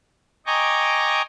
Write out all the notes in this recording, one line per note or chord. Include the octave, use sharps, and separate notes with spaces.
D#5 G5 G#5 A#5 C#6 D6